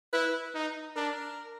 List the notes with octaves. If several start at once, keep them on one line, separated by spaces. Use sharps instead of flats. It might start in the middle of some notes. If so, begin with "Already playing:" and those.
E4 B4
D#4
D4 A#4